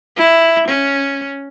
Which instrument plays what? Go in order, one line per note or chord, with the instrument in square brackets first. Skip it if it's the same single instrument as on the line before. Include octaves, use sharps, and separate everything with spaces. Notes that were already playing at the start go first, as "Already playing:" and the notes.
[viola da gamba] E4
C#4